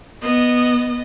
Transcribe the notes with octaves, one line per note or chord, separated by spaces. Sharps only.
B3 D#5